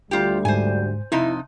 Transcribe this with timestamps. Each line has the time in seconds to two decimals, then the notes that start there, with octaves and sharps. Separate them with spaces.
0.11 D2 G3 F4 G4
0.45 G#2 C5 G#5
1.12 F2 C3 D#4 E4